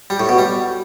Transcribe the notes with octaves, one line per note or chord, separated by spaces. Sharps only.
G3
A2
B2
G3